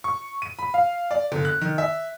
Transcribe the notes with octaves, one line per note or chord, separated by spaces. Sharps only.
C#6
D#7
B5
F5
D5
G1
F#6
D#3
E5